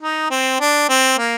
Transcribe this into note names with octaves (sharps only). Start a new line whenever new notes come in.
D#4
C4
D4
C4
A#3